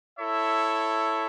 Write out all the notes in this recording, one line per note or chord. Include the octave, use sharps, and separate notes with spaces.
E4 A4 C#5 E5